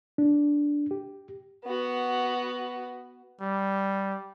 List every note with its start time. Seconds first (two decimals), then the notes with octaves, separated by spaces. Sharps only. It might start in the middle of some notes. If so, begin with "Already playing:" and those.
0.18 D4
0.91 G4
1.65 B3 F#4
3.42 G3